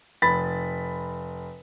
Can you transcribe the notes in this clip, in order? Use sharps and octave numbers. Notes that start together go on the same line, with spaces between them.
F1 B5 A6 B6